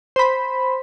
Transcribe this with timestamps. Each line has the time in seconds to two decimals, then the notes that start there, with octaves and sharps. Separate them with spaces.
0.16 C5 B5